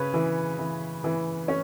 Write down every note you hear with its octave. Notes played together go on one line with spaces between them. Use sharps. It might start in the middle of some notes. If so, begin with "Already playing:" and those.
Already playing: C#3 B4 C#5
E3
E3
E3
C#4